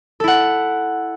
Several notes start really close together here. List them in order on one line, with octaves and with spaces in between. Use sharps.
A4 E4 F#5